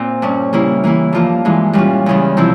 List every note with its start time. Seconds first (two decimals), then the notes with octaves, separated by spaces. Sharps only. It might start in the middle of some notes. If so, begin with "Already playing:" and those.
Already playing: A#2 C4
0.22 G2 G3 C#4
0.53 C#3 G3 A#3 E4
0.84 E3 A#3 E4
1.13 G2 F3 A#3 F4
1.45 G2 E3 G#3
1.73 A#2 G3 C#4 F4
2.06 E2 C#3 G3
2.37 C3 F3 C4 E4